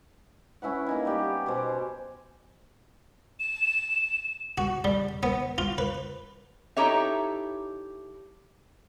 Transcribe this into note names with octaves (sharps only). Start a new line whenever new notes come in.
C#4 E4 B4 F#5
A#3 D#4 G#5
G3 B3 G4 D5
B2 C5 G#5 D6
E7
F#4
G3
B3
F4
B4
D#4 E4 G4 A4 C#5 E5